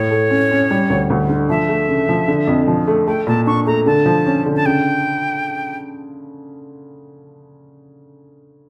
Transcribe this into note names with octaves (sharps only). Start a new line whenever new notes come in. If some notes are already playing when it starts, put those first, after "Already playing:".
Already playing: A2 C#5
A3
C#4
C#4
G3
D2
D2
D3
F3 E5
A3
C#3
F3
D3
F2
F3
A3
A3 G5
A#2 A5
D4 C#6
A3 A#5
D3 A5
F3
C#4
D3
A5
C#3 G5